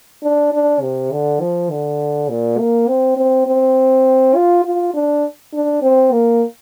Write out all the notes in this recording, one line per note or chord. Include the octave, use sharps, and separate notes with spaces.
D4
D4
C3
D3
F3
D3
A#2
A#3
C4
C4
C4
F4
F4
D4
D4
C4
A#3